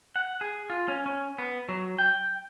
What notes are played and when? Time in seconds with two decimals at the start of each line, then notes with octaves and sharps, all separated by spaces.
0.16 F#5
0.41 G#4
0.70 F4
0.88 C#4
1.06 C#4
1.38 B3
1.69 F#3
1.99 G5